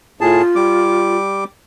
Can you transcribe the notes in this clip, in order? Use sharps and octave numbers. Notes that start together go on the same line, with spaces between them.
A2 F4 G#4 A5
G3 D6